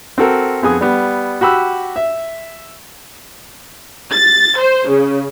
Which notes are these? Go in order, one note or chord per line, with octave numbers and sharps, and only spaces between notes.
C4 F#4 A4 A#4
F2 B3 G#4 G#5 D#6
G3 B3
F#4 G4 B5 E6 F#6
E5
A6
C5
C#3